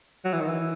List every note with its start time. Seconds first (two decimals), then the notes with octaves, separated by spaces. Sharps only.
0.25 F#3
0.33 E3
0.41 D#3
0.48 E3